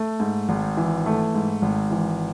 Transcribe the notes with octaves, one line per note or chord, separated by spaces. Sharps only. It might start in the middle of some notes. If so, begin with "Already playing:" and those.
Already playing: A3
G#2
G#1
E3
A3
G#2
G#1
E3